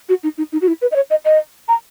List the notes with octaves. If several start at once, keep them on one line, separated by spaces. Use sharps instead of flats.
F#4
D#4
D#4
D#4
F#4
E4
B4
D#5
C#5
D#5
D#5
A#5